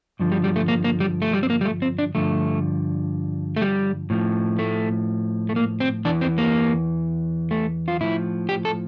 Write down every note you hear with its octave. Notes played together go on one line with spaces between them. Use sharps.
G2 D3 F3
G3
G3
A3
A#3
A#3
G3
A3
G3
C4
A#3
G3
A3
C4
D4
G2 D3 F3 A3
A3
G3
A2 F3
A3
A3
A#3
C4
E2 E3 D4
C4
A#3
A3
F4
A2 F3 E4
G4
A4